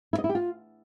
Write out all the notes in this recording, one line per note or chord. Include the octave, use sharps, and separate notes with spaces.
E4
D#5
E4
G4
F4